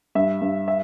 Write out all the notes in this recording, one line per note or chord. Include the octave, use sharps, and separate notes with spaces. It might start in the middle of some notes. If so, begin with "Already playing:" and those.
G2 E5
G2
E5